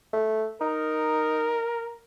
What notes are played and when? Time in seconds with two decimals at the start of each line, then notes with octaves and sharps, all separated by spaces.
0.13 A3
0.61 D#4 A#4